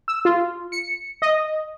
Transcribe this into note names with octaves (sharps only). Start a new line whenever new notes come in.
E6
F4
C#7
D#5